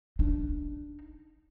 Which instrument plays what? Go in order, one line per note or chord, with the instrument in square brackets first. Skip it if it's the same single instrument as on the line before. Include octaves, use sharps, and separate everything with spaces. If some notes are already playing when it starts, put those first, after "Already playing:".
[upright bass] D4 D#4